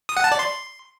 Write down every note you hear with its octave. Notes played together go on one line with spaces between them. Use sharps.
D#6
F#5
A5
D5
C6